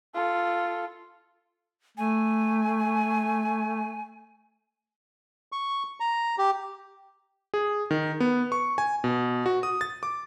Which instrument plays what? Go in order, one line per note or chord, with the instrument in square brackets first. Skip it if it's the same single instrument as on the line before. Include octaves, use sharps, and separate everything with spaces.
[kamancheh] F4 A4
[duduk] A3 [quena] G#5
[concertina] C#6
A#5
G4
[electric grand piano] G#4
D#3
B3
C#6
G#5
B2
F#4
D#6
A6
D6